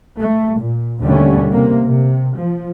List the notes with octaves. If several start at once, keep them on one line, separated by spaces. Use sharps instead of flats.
A3
A#2
D#2 B2 D3 G3 A3 C#4
C3 A#3
C3
F3